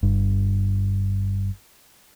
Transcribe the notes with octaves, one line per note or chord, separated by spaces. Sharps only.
G1 G2